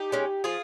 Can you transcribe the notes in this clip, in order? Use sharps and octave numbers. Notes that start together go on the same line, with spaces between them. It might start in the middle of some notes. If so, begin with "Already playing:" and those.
Already playing: D#4 G4
G#3 C#4
F3 F4 G#4